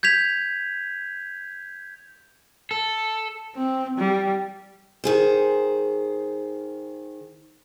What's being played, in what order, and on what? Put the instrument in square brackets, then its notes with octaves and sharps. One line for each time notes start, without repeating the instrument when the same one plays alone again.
[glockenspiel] G6 G#6 B6 F7
[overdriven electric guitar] A4
[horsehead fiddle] C4
G3
[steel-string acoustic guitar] D#3 G#4 C5